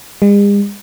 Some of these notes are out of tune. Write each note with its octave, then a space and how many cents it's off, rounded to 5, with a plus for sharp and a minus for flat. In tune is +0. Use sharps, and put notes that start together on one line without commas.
G#3 -45